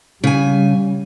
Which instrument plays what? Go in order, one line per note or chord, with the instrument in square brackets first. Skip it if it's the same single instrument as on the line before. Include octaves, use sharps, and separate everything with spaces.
[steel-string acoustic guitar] C#3 G#5 [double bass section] G3